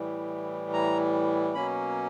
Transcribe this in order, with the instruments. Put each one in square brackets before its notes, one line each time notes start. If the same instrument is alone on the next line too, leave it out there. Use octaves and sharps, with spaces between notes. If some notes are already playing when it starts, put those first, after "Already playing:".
Already playing: [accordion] A2 E3 G3
A#5
B2 F#3 A#3 C#4 B5